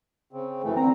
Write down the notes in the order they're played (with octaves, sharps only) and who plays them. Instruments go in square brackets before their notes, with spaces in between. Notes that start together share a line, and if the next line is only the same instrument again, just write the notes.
[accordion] C#3 C4
F#2 E3 A3
[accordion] D3 A#5 [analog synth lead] C4